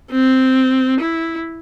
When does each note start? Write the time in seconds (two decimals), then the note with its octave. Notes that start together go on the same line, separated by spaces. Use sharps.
0.11 C4
1.00 E4